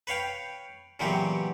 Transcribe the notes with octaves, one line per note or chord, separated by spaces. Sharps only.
B4 C#5 F5 G5
A#2 C#3 E3 F#3 B3 G4